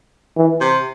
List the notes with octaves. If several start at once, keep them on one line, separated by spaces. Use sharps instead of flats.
E3
C3